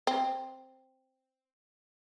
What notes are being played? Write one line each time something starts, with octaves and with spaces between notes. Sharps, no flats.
C4